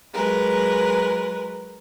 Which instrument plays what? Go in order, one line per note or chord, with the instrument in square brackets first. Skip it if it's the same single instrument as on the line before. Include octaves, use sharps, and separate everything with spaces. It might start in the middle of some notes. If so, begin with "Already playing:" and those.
[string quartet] F#3 G#3 A#4 B4